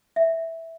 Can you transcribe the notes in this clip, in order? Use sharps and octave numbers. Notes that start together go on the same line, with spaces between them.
E5